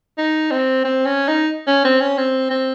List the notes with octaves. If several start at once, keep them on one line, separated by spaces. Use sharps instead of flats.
D#4
C4
C4
C#4
D#4
C#4
C4
C#4
C4
C4